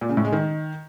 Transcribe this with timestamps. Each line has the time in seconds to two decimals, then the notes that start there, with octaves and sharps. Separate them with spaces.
0.01 A#2
0.09 C#3
0.17 A2
0.25 G#3
0.32 D#3